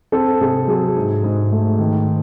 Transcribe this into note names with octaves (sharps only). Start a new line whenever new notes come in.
C4 A4
C3 G#4
F#3 G#4
G#2
G#2
A3
D#3